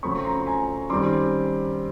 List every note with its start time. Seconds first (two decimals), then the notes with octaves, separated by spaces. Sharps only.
0.03 C#3 F#3 A3 C4 B5 C#6
0.25 A#5 C6
0.47 G#5 A#5
0.90 F#2 D#3 G3 C4 C6 D6